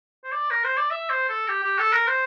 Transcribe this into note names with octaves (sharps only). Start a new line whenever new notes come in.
C5
D5
A#4
C5
D5
E5
C5
A4
G4
G4
A4
A#4
C5